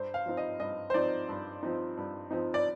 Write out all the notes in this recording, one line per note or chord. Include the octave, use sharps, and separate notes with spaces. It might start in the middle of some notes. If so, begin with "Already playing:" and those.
Already playing: G2 C5
F5
F3 C4 D#4
D#5
G2 D#5
C5
F3 C4 D#4 D5
G2
F3 C4 D#4
G2
F3 C4 D#4
D5